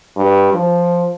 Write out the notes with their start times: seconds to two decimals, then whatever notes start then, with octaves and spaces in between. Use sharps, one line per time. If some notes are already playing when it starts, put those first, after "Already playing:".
0.17 G2
0.53 F3